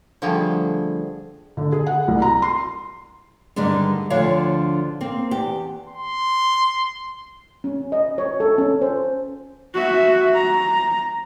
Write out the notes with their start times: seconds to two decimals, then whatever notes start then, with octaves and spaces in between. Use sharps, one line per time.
0.22 D3 F3 G3 A3 G#4
1.57 D3
1.72 G#4
1.86 F#5
2.08 C2
2.22 A#5
2.42 C6
3.56 G2 D3 D#3 G3 G#3
4.10 D2 D3 F3 D4 C#5 F5
5.01 A#3 C4
5.31 E2 G4
5.89 C6
7.64 C#4
7.92 D#5
8.18 C#5
8.40 A4
8.58 C#4
8.82 C5
9.74 F#4 E5
10.34 A#5